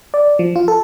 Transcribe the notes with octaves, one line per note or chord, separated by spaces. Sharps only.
D5
F3
F4
A4